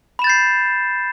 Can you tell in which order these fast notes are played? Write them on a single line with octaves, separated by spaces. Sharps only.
B5 E7 A6 G6 C7